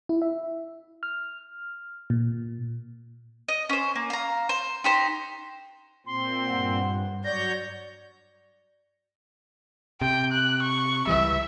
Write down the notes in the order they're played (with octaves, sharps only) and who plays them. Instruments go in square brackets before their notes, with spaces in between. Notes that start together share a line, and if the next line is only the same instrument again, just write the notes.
[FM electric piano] E4
E5
F6
A#2
[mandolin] D#5
C#4 C5
A#3
F5 A#5
C5
D#4 G4 C5
[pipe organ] A#2 C4 [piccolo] C6
[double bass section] G2 [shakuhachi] F#5
[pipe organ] F#3 C#5 G6 [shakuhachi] D5 [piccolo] A#6
[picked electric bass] C3 [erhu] G5
[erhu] F#6
C#6
[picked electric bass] C#2 E3 G3 [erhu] E5